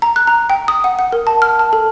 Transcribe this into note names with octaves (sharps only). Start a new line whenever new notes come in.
A#5
F#6
A#5
G5
D#6
F#5
F#5
A#4
A5
F6
A5
A4